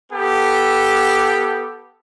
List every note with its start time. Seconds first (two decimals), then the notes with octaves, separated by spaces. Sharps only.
0.13 B3 G4 A4